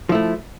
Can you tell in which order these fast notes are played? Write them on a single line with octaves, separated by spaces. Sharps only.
F3 E4 A3